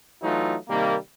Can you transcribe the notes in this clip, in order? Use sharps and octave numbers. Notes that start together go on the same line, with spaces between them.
E3 F#3 A3 D#4 F4
C3 D#3 G3 A#3